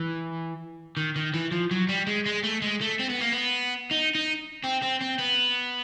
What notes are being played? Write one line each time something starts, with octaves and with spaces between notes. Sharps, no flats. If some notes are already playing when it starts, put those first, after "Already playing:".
Already playing: E3
D#3
D#3
E3
F3
F#3
G3
G#3
G#3
A3
G#3
A3
C4
B3
A#3
B3
D#4
D#4
C4
C4
C4
B3